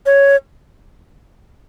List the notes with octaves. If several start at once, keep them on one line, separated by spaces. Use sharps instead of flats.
C#5